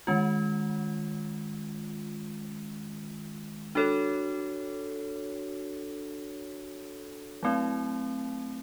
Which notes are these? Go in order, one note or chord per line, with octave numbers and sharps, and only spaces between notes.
D#3 G#3 C#4 F4
D4 F#4 A4 C#5
F#3 A3 C4 E4